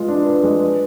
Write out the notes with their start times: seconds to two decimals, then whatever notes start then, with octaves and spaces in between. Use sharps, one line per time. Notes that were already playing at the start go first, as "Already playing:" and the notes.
Already playing: G#3 F4 B4
0.08 D4
0.25 B4
0.43 G#3
0.61 B4